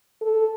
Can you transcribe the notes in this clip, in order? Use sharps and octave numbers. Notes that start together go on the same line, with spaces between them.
A4